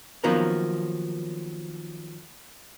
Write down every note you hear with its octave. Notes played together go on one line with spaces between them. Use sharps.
D#3 F3 F#3 A#3 B3 C#4